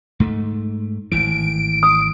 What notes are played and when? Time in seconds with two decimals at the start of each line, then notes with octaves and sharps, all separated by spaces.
0.20 G#2 A3
1.12 G#1 A2 E3 D7
1.83 D#6